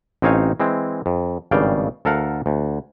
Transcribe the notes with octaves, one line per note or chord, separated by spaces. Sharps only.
A1 C4 D#4 C#5 F5 G#5
E3 G#3 C4
F2
G#1 G2 C#3 D5 F5 G5
D2 A4 A#4 F5 F#5 A5
D2